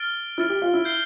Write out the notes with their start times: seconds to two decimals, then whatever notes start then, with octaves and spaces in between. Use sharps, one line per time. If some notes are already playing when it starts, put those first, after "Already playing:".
Already playing: F6 A6 D7 G7
0.38 E4 F6 A6 D7
0.49 G4
0.62 F4
0.73 E4
0.85 G6 C7 G7